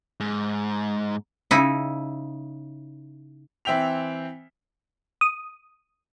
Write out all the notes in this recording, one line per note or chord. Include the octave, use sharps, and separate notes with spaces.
G#2
C#3 D#4 E4
E3 C4 E5 G5 B6 F7
D#6